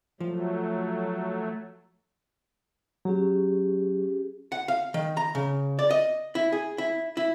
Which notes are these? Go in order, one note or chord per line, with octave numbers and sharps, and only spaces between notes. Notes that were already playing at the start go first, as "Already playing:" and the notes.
F3 F#3 A3
F#3 C#4 G4 G#4
F#5
F5
D#3
A#5
C#3
D5
D#5
E4
G#4
E4
E4